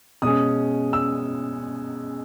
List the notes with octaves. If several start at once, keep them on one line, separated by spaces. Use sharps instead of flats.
B2 G#3 C#4 D#6
E6